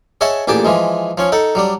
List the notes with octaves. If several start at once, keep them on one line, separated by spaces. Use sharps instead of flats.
G#4 C#5 D#5 E5 F#5 A5
A1 A#2 G4 G#4 A5 D6
E3 F3 G#3
F3 C#4 C#5
D#4 A4 F#5
F#3 G3 D4